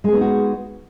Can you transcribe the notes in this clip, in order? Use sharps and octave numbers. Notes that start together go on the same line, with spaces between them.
G#3 B3 D#4 F#4 G#4